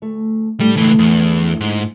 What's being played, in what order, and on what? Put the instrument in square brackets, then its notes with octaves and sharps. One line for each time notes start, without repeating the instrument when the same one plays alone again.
[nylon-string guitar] D2 A3
[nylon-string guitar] A2 D3 A3 [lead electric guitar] G3
[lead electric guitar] C#2 E3
E2
G#2